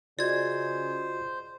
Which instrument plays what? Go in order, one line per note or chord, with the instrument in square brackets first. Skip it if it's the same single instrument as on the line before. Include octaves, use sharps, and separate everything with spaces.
[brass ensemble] C#3 G#4 [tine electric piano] F4 F#4 D#5 [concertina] C5 [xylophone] D5 G#6